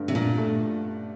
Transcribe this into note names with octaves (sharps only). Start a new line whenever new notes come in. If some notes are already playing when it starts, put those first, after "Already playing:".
Already playing: G2 D3 A3
C3
A#2 D4
A3